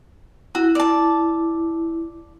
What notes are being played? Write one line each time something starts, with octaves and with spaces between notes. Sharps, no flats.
E4 F#4
D5 A5